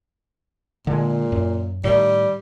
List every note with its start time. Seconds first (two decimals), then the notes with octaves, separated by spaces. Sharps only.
0.87 A#2 D3 G#3
1.32 F#2
1.84 A2 D#3 G3